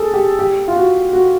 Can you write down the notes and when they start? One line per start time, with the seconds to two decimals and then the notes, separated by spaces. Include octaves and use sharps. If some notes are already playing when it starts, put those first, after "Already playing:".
Already playing: G#4 A4
0.14 G4
0.39 G4
0.68 F4
0.76 F#4
1.13 F#4